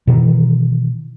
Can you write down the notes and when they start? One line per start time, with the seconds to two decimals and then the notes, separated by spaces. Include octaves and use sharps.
0.07 B2 D#3 E3